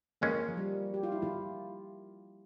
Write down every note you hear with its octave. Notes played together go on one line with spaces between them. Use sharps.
F2 E3 G#3 A#3 C#4
F3
G3
G4
F4
E4
F4